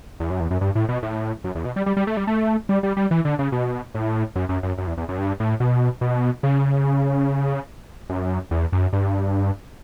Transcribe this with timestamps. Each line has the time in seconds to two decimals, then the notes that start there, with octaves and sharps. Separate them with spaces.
0.20 E2
0.30 F#2
0.40 E2
0.51 F#2
0.61 G2
0.75 A2
0.89 B2
1.03 A2
1.44 F#2
1.55 E2
1.65 B2
1.76 G3
1.86 G3
1.97 G3
2.07 A3
2.17 G3
2.27 A3
2.69 G3
2.83 G3
2.97 G3
3.11 E3
3.25 D3
3.39 C#3
3.52 B2
3.94 A2
4.36 F#2
4.49 F#2
4.63 F#2
4.78 F#2
4.87 E2
4.97 E2
5.09 F#2
5.18 G2
5.40 A2
5.60 B2
6.01 B2
6.43 C#3
8.10 F#2
8.51 E2
8.72 F#2
8.93 G2